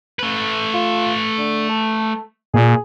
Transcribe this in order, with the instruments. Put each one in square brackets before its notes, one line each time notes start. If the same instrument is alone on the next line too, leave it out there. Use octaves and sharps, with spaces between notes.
[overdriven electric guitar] A3 B4
[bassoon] F4
D3
A4
[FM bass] A#2 [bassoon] G#4